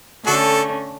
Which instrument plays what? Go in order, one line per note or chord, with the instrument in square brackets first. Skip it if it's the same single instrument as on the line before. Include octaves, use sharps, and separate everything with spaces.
[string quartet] D3 A3 C#4 [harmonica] D4 F#4 A4